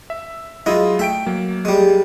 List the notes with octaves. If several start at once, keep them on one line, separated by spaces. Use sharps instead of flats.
E5
F#3 G#3 E4 F4 D#5
A3 E5 G5 D7
F#3 A#3
G3 G#3